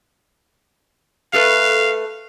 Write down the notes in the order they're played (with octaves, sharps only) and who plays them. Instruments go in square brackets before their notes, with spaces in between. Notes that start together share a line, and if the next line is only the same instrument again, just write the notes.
[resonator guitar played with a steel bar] A3 A4 B4 [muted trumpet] F5